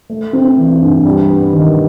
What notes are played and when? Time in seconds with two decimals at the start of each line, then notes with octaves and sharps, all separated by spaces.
0.10 A3
0.33 C4
0.58 E3
0.81 G2
1.05 G3
1.29 B3
1.53 D#3